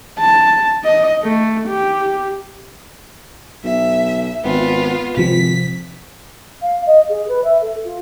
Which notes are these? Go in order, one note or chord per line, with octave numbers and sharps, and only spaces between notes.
A5
D#5
A3
G4
B1 E5
G#1 B3 F4
G#1 C3 F3 B6
F5
D#5
G#4
B4
E5
A4
F4